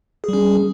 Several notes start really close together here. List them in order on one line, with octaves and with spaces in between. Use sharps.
G#4 G3 C#4